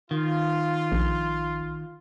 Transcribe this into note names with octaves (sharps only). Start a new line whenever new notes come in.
D#3 F4
A#1